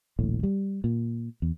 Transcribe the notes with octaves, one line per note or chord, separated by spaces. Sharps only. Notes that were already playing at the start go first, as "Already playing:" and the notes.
D#1 A#1 A2
G3
A#2
E2